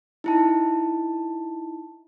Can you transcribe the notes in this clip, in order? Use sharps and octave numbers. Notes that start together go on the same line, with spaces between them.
D#4 E4 A5